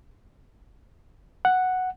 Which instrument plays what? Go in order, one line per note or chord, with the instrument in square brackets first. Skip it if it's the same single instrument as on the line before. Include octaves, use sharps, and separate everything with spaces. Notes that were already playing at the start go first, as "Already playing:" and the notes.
[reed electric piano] F#5